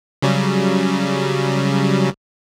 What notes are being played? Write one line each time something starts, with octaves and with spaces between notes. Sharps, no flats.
C#3 F#3 G3